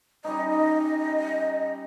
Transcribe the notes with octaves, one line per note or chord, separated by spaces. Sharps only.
G3 C#4 D#4 D#5